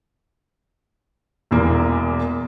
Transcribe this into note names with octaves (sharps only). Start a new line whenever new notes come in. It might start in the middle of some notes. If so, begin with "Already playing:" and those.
E1 E2 A#3